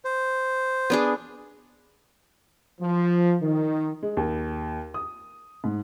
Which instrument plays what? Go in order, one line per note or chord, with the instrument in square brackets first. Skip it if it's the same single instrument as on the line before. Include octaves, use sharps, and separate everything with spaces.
[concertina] C5
[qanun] B3 D4 G#4
[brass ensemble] F3
D#3
[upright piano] G#3
D#2
D#6
G#2